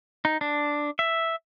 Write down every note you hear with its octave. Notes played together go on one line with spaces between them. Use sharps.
D#4
D4
E5